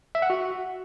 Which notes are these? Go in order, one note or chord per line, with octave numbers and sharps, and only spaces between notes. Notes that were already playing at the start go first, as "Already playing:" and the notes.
E5
F#5
F#4